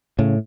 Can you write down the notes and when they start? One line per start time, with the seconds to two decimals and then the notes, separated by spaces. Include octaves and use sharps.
0.19 A2 C#3